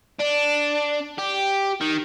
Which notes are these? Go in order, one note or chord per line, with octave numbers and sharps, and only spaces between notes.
D4
G4
D#3